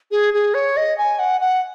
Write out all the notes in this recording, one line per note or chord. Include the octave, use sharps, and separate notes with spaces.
G#4
G#4
C#5
D#5
G#5
F#5
F#5